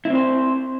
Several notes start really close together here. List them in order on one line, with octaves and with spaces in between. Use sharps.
E4 C4 C5